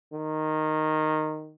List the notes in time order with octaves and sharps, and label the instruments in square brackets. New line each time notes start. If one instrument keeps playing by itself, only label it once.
[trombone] D#3